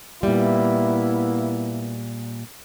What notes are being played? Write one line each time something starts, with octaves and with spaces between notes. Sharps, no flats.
A#2 G3 A#3 B3 E4